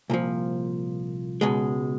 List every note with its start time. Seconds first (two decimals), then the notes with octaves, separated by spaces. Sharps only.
0.10 C2 A#2 F3
1.41 C#2 B2 G#3